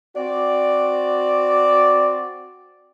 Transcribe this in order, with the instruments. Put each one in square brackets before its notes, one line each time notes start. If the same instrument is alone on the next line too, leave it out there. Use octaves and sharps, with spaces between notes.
[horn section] C4 F#4 D5